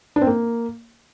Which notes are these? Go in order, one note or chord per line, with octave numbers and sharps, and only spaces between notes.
D4
C4
A#3